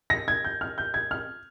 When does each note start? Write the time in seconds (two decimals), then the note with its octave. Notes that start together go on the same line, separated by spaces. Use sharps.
0.10 A#6
0.28 G#6
0.44 G6
0.61 F6
0.78 G6
0.94 G#6
1.11 F6